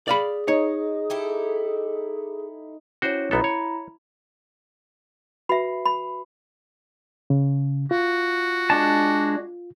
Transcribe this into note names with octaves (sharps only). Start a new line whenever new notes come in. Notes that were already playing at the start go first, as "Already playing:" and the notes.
G#4 D5 F5 B5
D#4 C#5
E4 G4 A4
C#4 E4 F#4 C5 C#5
B1 B3 E4 A4 A#5 B5
C#5
F#4 B4 E5 B5 C7
B5
C#3
F4 F#4
G#3 D4 A5